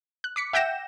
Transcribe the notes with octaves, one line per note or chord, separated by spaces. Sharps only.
F#6
D6 B6 C#7
E5 F#5 G5 G6 A#6 E7